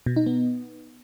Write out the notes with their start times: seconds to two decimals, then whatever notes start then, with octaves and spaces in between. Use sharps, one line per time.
0.06 B2
0.16 D#4
0.26 B3